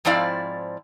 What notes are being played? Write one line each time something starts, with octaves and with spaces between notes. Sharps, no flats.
G#2 F3 C4 E4 D5 F5